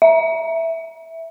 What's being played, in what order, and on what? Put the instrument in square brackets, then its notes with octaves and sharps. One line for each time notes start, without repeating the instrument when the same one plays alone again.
[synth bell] E5